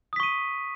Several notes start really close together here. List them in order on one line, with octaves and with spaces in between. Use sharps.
D#6 B6 C#6 D#7